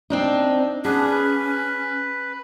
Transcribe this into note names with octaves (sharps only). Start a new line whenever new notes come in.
C4 D4 D#4
B3 C#4 D4 G#4 B4
B4